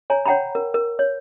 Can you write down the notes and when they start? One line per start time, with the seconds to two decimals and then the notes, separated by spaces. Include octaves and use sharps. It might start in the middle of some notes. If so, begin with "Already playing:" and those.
0.10 C#5 G#5 A#5
0.25 C#5 F#5 G5 A#5 B5
0.55 A#4
0.74 A#4
0.99 C#5